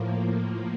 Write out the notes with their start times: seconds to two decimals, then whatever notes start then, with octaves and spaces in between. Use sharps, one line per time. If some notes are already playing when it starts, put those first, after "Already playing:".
Already playing: A2 F3 A#3